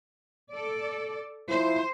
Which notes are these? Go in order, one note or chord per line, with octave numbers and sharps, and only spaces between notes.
A4 D5
F3 E4 C5